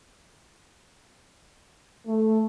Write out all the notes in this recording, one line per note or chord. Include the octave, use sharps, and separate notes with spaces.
A3